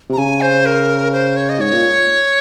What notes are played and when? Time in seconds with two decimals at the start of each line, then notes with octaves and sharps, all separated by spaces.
0.10 C3
0.13 A#5
0.18 C#3 G#5
0.41 C5
0.66 A#4
1.13 C5
1.37 C#5
1.49 D#5
1.60 G#2 C#5
1.73 A#2